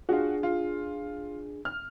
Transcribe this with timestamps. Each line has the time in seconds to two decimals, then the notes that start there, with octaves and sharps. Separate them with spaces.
0.09 D4 F4 F#4 G#4
0.43 F4
1.65 F6